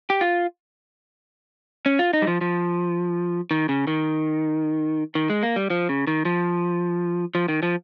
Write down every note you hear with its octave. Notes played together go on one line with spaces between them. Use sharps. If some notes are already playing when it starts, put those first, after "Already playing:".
G4
F4
C#4
F4
D#4
G3
F3
F3
D#3
C#3
D#3
D#3
G#3
A#3
G3
F3
C#3
D#3
F3
F3
D#3
F3